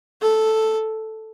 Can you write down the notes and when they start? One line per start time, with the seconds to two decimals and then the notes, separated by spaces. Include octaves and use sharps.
0.22 A4